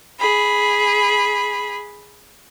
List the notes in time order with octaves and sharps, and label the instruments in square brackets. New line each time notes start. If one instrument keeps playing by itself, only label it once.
[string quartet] G#4 B5